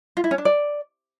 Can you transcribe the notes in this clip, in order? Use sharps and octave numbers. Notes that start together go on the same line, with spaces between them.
F4
E4
C#4
D4
D5